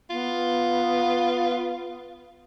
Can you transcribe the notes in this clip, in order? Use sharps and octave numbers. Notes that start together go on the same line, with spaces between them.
B3 F4